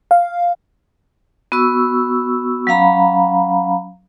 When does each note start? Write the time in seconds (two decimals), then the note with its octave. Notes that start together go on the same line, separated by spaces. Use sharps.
0.11 F5
1.52 B3 F#4 C#6 E6
2.67 F#3 C#4 F5 A#5 B5